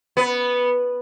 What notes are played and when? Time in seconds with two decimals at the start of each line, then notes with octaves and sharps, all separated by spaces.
0.17 B3